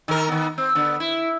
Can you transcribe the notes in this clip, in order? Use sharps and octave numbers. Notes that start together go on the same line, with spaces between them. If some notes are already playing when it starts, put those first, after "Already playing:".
D#3 A#4
D#3 B3
C4
D3 B3
E4